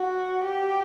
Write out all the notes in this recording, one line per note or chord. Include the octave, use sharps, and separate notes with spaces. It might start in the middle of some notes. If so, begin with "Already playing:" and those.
Already playing: F#4
G4